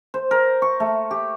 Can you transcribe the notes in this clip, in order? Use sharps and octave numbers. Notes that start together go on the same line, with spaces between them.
C5
A#4
C#6
A3
G4